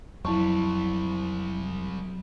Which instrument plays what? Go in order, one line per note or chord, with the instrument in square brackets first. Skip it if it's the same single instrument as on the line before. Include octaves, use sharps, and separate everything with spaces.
[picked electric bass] F2 [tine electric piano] F#3 [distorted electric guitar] G3 C4 [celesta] E4 A5 C#6